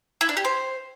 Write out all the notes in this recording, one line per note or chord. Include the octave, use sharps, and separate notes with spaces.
E4
D4
G4
C5